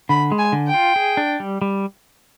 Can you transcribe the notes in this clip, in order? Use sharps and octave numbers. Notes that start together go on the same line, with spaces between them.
D3 B5
G#3
G#5
D3
G5
F4
G#4
D4
G3
G3